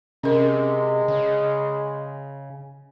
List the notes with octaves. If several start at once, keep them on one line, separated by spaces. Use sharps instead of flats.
C3 G#3 C#4 A#4
C#3